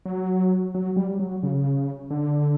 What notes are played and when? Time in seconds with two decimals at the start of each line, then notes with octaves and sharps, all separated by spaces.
0.06 F#3
0.75 F#3
0.96 G3
1.19 F#3
1.43 C#3
2.10 D3